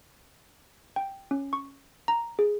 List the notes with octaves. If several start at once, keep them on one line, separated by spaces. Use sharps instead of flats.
G5
C#4
C#6
A#5
G#4